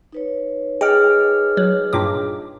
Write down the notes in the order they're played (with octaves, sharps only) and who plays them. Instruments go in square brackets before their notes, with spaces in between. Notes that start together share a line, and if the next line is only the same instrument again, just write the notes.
[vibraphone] D#4 B4 C#5
[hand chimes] G#4 D#5 F6 [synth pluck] G5
[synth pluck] F#3
G2 A#2 D6